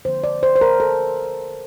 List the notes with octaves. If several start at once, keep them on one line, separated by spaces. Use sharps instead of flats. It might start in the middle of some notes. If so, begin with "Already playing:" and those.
D3 F3 A#3 C5
D5
C5
C5
A#4
A4